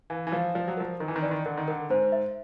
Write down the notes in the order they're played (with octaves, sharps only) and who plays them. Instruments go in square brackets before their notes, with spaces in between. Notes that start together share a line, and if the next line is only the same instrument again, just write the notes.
[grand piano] E3 [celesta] F5
[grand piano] E3
[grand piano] F3 [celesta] F5
[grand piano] F3 [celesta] D5
[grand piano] F#3
[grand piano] F3 [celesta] A#4
[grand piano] D#3 [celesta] A#4
[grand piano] E3
D#3
[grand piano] E3 [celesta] D5
[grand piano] D#3
[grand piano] D3 [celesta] A#4
[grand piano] D#3
[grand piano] D3 [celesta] A#4
[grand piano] G#2 [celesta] C5
[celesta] E5